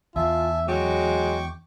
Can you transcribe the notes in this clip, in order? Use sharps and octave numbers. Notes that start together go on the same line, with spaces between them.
E2 F4 E5 G#5 A5
F#3 G#3 G5 C#6 D6